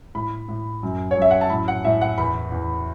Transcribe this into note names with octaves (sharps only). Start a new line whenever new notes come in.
A2 B5
A2
F#2
C#5
F#2 E5
F#5
A5
A2 B5
F#5
A2 E5
F#5
E2 B5
E2